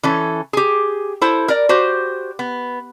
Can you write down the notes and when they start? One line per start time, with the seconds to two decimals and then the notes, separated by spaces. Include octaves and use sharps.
0.03 E3 C#4 A4
0.53 G4 G#4
1.21 E4 A4 C5
1.48 A#4 D5
1.69 F#4 G4 C5
2.39 B3